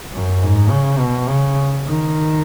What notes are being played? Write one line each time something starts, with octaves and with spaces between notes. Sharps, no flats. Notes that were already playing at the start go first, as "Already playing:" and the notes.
F#2
G#2
C#3
B2
C#3
D#3